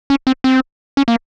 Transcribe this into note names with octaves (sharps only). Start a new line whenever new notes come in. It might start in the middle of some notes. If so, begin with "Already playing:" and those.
C#4
C4
C4
C#4
A#3